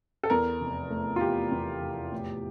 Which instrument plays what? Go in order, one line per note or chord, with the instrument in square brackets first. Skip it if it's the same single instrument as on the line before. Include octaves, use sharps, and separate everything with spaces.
[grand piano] A4
E2 A#4
F1
A3
F4
E3 G4
E2
F1
A2